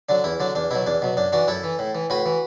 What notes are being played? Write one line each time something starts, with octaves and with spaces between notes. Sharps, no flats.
D3 F#3 D4
E2 E4
D3 F#3 D4
E2 D4
B2 F#3 E4
E2 D4
B2 F#3
F#2 D4
E3 D4 F#4
F#2 E4 A4
E3
A2
E3
A2 F#4 B4
E3